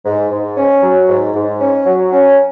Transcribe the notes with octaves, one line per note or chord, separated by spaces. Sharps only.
G#2
G#2
C#4
F#3
G#2
G#2
C#4
F#3
C#4